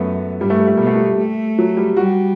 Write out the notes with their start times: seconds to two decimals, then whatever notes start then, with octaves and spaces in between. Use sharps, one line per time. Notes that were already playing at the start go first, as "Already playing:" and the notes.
Already playing: F#2 A3 B3
0.41 G2 G3
0.50 A3
0.59 G3
0.67 A3
0.77 B2 G3
0.87 A3
0.96 G3
1.19 A3
1.59 F#3
1.77 G3
1.97 G3 F#4